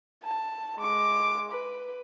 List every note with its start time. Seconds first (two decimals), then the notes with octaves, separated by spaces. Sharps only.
0.23 A5
0.78 G#3 D6
1.52 B4